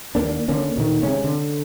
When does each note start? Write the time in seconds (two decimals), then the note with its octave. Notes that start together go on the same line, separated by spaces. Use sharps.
0.15 D#2 A2 A#3 D4
0.48 D3 A#3 C#4
0.76 D2 A#2 D#3
1.03 C3 G#3 C#4
1.24 D3